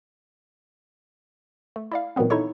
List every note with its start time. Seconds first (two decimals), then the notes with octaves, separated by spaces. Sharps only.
1.76 A3
1.92 E4 D5 F5
2.16 A#2 D#3 E3 F#3 B3 C4
2.30 D#4 E4 A4 C#5 C#6